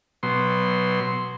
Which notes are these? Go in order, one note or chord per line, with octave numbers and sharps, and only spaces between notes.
B2 F#3 C6